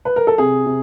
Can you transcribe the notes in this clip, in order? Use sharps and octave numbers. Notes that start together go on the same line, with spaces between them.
B4
A#4
A4
C3 G#4
C3